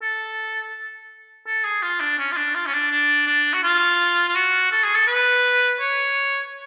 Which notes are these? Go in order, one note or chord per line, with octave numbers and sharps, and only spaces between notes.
A4
A4
G#4
F4
D4
C#4
F4
D4
F4
C#4
D4
D4
D4
F#4
F4
F4
F#4
A4
G#4
A4
B4
C#5